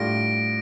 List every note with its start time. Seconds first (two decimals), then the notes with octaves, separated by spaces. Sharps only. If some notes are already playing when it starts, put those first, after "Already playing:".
Already playing: A2 G3 D4 F4 A#6 D7